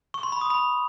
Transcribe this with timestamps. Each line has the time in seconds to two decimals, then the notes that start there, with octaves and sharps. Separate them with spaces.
0.14 C#6
0.23 C6
0.32 B5
0.41 D#6
0.50 B5